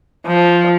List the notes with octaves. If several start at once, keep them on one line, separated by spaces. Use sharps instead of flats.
F3